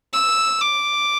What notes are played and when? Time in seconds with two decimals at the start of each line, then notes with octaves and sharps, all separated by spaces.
0.13 E6
0.62 D6